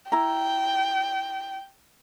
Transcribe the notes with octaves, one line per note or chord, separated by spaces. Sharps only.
E4 G5 A#5